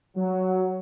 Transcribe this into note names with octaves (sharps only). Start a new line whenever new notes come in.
F#3